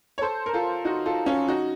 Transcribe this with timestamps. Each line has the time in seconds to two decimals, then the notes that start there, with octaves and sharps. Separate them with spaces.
0.18 C#5
0.21 A4 C5
0.46 A#4
0.53 F4 A4
0.85 D#4 F#4
1.06 F4 A4
1.26 C#4 F4
1.48 D#4 F#4